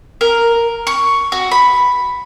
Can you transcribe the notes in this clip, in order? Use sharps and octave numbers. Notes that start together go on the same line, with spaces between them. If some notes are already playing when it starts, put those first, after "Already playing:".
A#4
C#6
F#4
B5